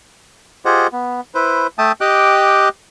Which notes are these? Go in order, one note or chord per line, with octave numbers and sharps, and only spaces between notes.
F4 G4 G#4 C5 D#5 F#5
B3
E4 B4 C5
A3 E5 G5 A5 D#6
G4 D#5 G5 D6 F#6